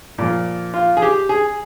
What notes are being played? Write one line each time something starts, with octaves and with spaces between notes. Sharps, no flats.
A#2 F3
F4
G#4
G4
G#4